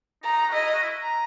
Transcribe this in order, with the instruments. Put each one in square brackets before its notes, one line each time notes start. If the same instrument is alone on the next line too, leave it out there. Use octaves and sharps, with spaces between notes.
[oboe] D#4 [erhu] A#5
[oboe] F#4
[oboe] E4 [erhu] D#5
[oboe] F#4
E4
A#5